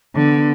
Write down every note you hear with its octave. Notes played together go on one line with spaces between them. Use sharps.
D3 B3